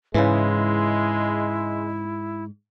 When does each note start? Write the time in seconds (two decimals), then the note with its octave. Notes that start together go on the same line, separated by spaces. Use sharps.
0.14 G#2 C#3 E3 G#3 E4